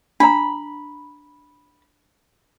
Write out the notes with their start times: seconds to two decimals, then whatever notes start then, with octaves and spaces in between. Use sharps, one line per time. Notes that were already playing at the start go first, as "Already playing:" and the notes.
0.20 D4 A#5 B5